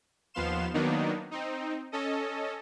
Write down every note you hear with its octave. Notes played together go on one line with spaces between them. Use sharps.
D#2 F3 B3 F5 C6 E7
D#3 F#3 A#3 B3 D4 D#4
C4 D#4
C#4 A4 D#5